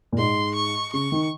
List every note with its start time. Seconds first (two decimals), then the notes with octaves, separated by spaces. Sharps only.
0.12 A#2
0.18 G#2 C6
0.55 C#6
0.93 C#3 C#6
1.12 D#3